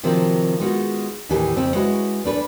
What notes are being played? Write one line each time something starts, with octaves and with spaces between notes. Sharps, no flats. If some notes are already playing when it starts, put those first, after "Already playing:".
C3 D#3 F3 F#3 C4
G#3 B3 D#4 F4 F#4
D#2 A2 E3 D#4 G4 G#5
F2 C#3 C4
G#3 C#4 E4 F#4 B4
E2 A3 D4 B4